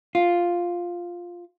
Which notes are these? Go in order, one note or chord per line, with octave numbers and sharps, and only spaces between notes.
F4